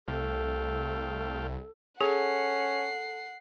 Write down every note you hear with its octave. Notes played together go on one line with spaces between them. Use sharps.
C2 A3 A4 F5 G5
C#4 G#4 A4 F#5 C7